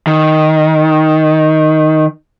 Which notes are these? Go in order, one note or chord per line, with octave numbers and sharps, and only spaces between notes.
D#3